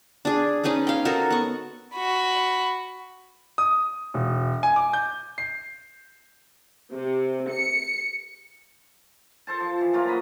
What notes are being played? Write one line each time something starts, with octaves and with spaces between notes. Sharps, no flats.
D4 G#4
C#4 D#4 G#4 B4
F5 G5
D#4 F#4 A4 A#4
B3 C#6
F#4 B5
D#6
E1
G#5
D6
G6
C7
C3
C#7
A4 C5 A5
F3
E3
F#3 A#3 F4 A#4
F#4 C5 D#5 B5